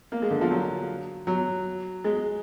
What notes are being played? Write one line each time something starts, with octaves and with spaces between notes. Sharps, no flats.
A#3
G#3
D3
F3
F#3
F#3
G#3